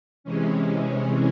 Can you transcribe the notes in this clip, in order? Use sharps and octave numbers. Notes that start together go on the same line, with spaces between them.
C3 E3 G#3 C#4